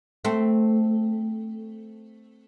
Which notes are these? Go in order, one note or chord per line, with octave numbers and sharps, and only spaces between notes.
A3 C4